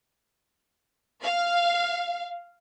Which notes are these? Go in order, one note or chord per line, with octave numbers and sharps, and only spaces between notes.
F5